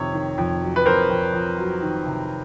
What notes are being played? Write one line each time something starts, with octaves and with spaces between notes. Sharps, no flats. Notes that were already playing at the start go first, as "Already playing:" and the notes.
Already playing: F2 C3 D#3 C#5
D#3
F2
F#3
B4
F2 A#4 C5
F2
F2
F#3
D#3
C3